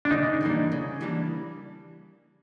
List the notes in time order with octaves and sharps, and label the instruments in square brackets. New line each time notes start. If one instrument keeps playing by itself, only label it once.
[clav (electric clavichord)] D4
[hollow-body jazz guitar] C#3 [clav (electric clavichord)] D#4
[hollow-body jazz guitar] E3 G3 A#3 D4
C#3
E3 G3 A#3 D4